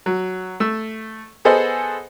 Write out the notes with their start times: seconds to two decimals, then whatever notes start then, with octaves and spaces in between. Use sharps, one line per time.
0.06 F#3
0.60 A3 E6
1.45 B3 G#4 A4 C5 D#5 F#5